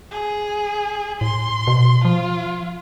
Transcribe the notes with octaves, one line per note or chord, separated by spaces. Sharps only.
G#4
A2 C6
B2
F3 F4